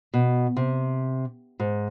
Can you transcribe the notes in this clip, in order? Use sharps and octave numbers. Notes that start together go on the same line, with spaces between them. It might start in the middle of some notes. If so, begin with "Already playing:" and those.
B2
C3
G#2